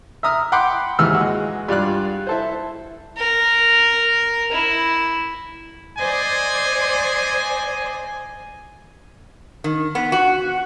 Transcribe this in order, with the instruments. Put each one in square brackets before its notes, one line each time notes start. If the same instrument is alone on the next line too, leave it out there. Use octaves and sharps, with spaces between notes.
[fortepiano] E5 A#5 D#6 F6
F#5 G5 B5 C6 D6
D#2 G#2 E3 E4 E6 F6
G#3 F#4
G2 F4 D5 F#6
E4 A4 C5
[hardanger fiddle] A#4
E4
[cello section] C5 D5 [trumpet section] D#5 G#5
[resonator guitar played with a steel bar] D#3
B3
F#4